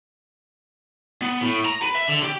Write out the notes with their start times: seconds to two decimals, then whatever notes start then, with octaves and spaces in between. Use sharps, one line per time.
1.22 B3
1.41 A2
1.65 A#5
1.82 B4
1.95 E5
2.08 D3
2.23 G4